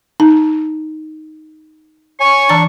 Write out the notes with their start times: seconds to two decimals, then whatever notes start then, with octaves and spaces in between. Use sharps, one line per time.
0.20 D#4 A5
2.20 C#5 G#5 C#6
2.49 E3 D4 A#5 A6